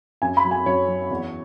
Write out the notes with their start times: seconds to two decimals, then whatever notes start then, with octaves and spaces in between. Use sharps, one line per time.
0.22 F#2 G#5
0.37 B5
0.45 F#3
0.51 G#5
0.66 F#2 C#5
0.88 F#3
1.11 E2